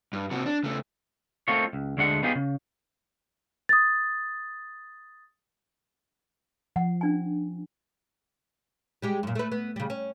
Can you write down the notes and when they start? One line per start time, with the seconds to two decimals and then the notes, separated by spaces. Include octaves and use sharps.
0.13 G2
0.31 C3 F#4
0.46 D4
0.64 C#3 A3
1.48 A3 A#3 C4 D#4 F4 C#5
1.73 C#2
1.97 D2 D3 G#3 D4 F#5
2.23 B3 D#4 F4 G4 G#4
2.35 C#3
3.69 D#6 A6
6.76 F3 F#5
7.01 C#4 D4 G#5
9.02 G3 G#3 G4
9.23 F#2 A#2
9.35 A3 B4
9.52 B3
9.76 C#3 G3
9.90 C#4